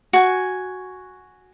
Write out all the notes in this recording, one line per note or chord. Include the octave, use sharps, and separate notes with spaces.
F#4 G#5